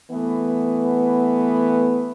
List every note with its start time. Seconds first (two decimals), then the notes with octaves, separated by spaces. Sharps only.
0.11 E3 A3 B3